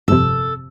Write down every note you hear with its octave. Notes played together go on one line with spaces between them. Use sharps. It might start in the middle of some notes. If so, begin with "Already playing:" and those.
G1 F2 C3 A4